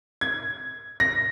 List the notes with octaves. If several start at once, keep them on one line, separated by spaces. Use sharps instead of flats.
G#6
A#6